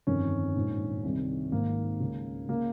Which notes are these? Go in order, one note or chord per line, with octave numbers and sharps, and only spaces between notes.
G1 F2 D#3 C#4
A#1 G#2 D#3
C2 C3 D#3
G#1 G#2 D#3 A#3
C#2 C#3
C#3 A#3